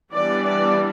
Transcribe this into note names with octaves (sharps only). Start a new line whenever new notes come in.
E3 G3 B3 D4 D5
D5